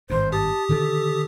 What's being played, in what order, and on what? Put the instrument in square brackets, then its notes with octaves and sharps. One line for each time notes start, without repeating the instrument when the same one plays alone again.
[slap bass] G#1 G2 [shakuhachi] C5
[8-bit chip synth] G4 D#6 [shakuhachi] A5
[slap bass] B2 D3 D#3 [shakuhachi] A4